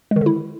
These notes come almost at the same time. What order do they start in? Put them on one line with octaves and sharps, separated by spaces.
G#3 D#3 D3 E4